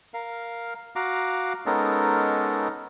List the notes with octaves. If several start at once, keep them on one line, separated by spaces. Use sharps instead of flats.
A#4 F5
F#4 F5 A#5 D6
G#3 B3 C#4 D#4 A4 A#4